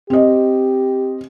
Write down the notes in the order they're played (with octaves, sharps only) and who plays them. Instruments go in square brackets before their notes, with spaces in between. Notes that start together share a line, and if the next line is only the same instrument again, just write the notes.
[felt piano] C4 D#5 [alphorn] G4